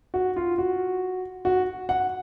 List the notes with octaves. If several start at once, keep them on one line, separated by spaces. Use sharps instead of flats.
F#4
F4
F#4
F#4
F#5